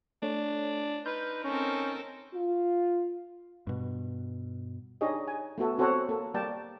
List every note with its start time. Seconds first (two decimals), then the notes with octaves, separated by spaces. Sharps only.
0.22 A3 D4 C#5
1.06 D#4 B4 C6 F6 G6
1.44 C4 C#4 A4 A#4
2.35 F4
3.67 G2 B2
5.01 D4 D#4 G4 G#4 C#5 D#5
5.28 G#5
5.58 A3 B3 F#4 A4
5.78 C4 F#4 A4 C5 C#5 F#5
6.09 A#3 A4
6.34 G3 A#3 D5 G5 A5